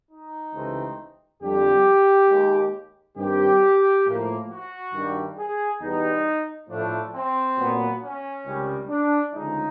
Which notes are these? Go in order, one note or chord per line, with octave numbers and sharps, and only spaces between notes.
D#4
C#2 C3 E3 A3 C4
F2 D3 G3 G4
D#2 D#3 G#3
G2 D#3 G3 C4 G4
A2 F3 A#3
F#4
G2 D#3 G3
G#4
E2 B2 G3 B3 D#4
A2 F3 A3 D4
C4
A#2 F#3 B3
C#4
C#2 C3 D#3 G3
D4
D2 C#3 F3 G#3 D#4